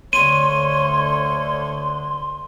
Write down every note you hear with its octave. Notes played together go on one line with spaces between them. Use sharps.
D2 D3 C#5 C6 D#7